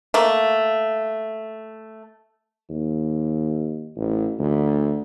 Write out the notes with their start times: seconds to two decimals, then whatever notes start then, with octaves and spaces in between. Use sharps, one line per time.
0.14 A3 A#3
2.69 D#2
3.97 A1
4.39 D2